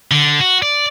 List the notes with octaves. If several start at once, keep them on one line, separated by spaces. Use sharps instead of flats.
D3
F#4
D5